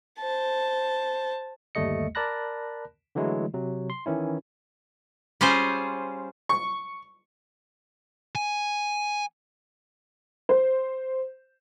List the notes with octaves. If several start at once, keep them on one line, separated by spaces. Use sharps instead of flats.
C5 A5
G1 D#2 G3 A3 D#5 C#7
A#4 D5 A5 B5 F#6 A#6
D3 E3 F#3 G#3 A3 E4
C3 F#3
C6
D#3 E3 C#4 E4
G3 C#4 F4 G#4 C5
C#6
G#5
C5